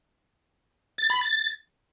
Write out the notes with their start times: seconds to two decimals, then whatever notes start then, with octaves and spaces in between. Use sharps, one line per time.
0.98 A6
1.10 B5
1.21 A6